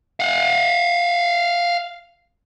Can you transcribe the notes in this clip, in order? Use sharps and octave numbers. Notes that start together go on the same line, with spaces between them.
F5 F#5